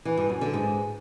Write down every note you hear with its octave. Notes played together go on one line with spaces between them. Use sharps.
E3
G2
F#2
D3
G#2